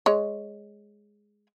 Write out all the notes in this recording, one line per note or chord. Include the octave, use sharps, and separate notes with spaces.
G#3 C#5